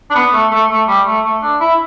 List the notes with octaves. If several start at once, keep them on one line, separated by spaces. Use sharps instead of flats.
D4
B3
A3
A3
A3
G3
A3
A3
D4
E4